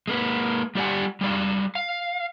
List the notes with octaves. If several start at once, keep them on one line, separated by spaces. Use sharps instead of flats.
G#3 A#3 B4
G3 G4 D5 F#5 G#5
G3 G#3 D5 F5
F5